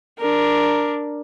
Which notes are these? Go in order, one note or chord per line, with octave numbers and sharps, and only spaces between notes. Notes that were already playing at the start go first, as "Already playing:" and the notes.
D4 A#4